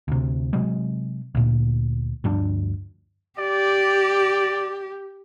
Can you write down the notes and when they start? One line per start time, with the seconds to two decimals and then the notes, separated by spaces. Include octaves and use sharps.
0.08 D2 C3
0.53 C3 F#3 G#3
1.35 D2 A#2
2.24 D2 G2 F3 D4
3.39 G4 D5